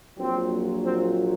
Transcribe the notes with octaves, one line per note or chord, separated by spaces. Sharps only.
A#1 A#2 F#3 C4
C4